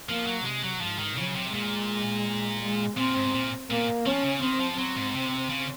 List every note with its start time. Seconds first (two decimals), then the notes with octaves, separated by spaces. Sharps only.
0.09 F3 A#3
0.27 F#3
0.45 C3 G#3
0.63 F#3
0.81 G#2 F3
0.99 D#3
1.17 C#3 F#3
1.35 C3
1.53 A#2 G#3
2.62 G#3
2.97 A#2 C4
3.16 G#2
3.33 A#2
3.70 A#2 A#3
4.06 F3 C#4
4.24 C#3
4.42 D#3 C4
4.60 F3
4.78 F#3 C4
4.97 G#2
5.14 C3
5.50 C#3